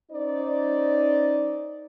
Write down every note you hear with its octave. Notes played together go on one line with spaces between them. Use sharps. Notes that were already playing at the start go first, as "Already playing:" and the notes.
C#4 D#4 C5 D5